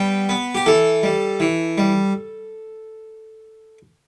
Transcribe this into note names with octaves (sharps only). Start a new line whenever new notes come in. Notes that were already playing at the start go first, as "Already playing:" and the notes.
Already playing: G3 B3 G5
B3
G4
E3 A4
G3
E3
G3